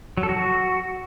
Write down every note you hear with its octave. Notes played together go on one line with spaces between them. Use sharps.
F#3
A4
F#4